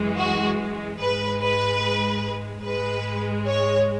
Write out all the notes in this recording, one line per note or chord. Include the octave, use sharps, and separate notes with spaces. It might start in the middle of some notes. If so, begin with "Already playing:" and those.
Already playing: F#2 E3 G#3
F#4
G#2 G#3 B4
B4
G#2 G#3 B4
C#5